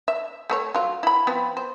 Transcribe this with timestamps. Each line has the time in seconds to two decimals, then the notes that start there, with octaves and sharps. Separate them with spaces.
0.08 E5
0.50 A3 A4 C#5
0.74 F#3 F4
1.03 E4 B5
1.27 F3 B3 C4
1.57 C5